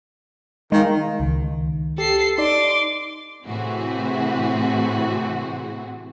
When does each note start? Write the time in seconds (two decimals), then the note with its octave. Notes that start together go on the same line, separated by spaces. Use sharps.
0.72 D#3 G#3 F5
1.20 C#2 D#3
1.98 G4 A4 C7
2.38 D#4 D5 C6 D6
3.45 A2 C3 E3 C4 F#4 G#4